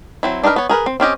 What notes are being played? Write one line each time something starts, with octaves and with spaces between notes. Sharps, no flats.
F#3 C4 E4
D4 D#4 G#4 A#4 B4
B3 C#5
G#4 A#4 B4
C4
C4 C#4 G4 D#5